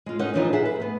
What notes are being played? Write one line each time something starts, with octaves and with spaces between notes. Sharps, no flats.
G#3 F4
C#4 D#4 C#5 D#5 F#5
A#2 C#3 E3 F3 D4 D#4
G#4 E5 F#5
B4
A3 B3